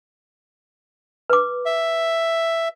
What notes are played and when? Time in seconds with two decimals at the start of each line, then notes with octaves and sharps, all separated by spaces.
1.30 B4 D6
1.66 E5